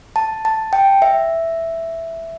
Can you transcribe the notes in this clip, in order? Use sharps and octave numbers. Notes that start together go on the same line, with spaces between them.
A5
A5
G5
E5